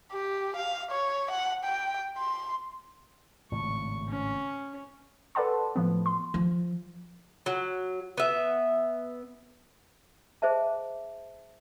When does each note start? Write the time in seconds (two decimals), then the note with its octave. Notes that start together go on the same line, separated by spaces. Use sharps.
0.12 G4
0.57 F5
0.91 C#5
1.31 F#5
1.64 G5
2.18 C6
3.52 G#1 A2 C#3 C#6
4.09 C#4
5.35 A4 B4 D5 F#5 A5 C6
5.76 A2 F3 B3
6.06 C6
6.34 F3
7.46 F#3
8.18 B3 E5
10.42 G#4 C5 D#5 E5 A5